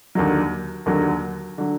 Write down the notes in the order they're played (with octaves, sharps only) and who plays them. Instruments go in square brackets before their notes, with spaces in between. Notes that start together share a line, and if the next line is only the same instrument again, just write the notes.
[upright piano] D#2 D3 F#3
D#2 D3 F#3
D3 F#3